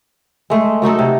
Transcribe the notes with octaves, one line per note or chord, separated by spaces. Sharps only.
G#3 A3
F#3 A3 D#4 A4
C3